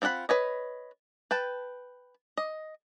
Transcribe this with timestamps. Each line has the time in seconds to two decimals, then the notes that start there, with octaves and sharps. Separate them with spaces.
0.02 C4 F4 A4 F#5 B5
0.29 B4 C#5 D#5
1.31 B4 G5 A5
2.37 D#5